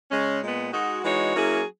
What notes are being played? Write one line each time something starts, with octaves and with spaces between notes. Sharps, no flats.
C#3 G#3 C#4
A#2 G#3 B3
G#3 D#4 F#4
E3 G#3 D#4 F#4 C#5
F#3 A#3 C#4 E4 G#4